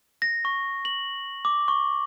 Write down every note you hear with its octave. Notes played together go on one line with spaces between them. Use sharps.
A#6
C#6
F#7
D6
C#6